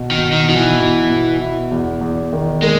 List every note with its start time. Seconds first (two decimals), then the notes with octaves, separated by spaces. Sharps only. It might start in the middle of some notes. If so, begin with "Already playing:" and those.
Already playing: B2
0.11 D#3
0.18 B2
0.33 D#3
0.49 B2 D#3
0.56 E3
0.80 B2
1.10 B2
1.40 E4
1.71 E2
2.01 E2
2.33 D#3
2.62 G#3 A#3